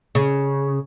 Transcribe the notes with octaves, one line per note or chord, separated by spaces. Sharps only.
C#3